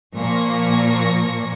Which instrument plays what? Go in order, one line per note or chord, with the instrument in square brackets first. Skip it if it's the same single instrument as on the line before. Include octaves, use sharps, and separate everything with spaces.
[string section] A#2 F3 A#3 C#6 A#6